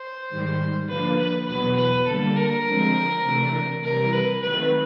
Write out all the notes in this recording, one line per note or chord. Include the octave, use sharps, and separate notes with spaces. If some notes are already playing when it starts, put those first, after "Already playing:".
Already playing: C5
G#2 D#3 G3
D3 F3 A#3 D4 B4
B4
E2 B2 F#3 B3 B4
B4
D3 G3 A#3 A4
A#4
D3 F3 G#3 C4
C3 E3 A3 D4
C3 E3 G3 A#4
B4
D#3 F#3 A3 C4 B4